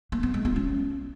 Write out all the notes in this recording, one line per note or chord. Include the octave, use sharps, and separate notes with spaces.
A#3
B3
G#3
F4
C#4